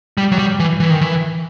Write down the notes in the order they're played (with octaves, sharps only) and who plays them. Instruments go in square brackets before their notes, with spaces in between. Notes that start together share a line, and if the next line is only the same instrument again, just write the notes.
[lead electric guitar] G3
F#3
G3
E3
E3
D#3
E3